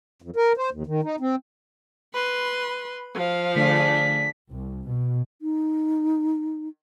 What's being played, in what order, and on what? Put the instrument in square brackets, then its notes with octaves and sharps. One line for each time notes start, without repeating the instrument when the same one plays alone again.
[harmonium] F2
A#4
C5
D#2
D#3
D#4
C4
[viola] B4 C6 [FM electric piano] B5
[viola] F3 F5
[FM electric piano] D3 A3 [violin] D4 G#4 [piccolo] B6
[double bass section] C2
B2
[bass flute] D#4